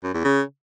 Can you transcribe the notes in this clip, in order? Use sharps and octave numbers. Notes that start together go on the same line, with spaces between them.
F#2
E2
C#3